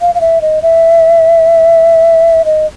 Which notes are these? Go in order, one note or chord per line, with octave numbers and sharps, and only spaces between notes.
F5
F5
E5
D#5
E5
D#5